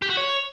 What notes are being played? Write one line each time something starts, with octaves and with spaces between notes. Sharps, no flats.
G4
F#4
C#5